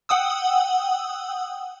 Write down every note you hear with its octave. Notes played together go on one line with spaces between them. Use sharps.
F#5 G5 D#6 E6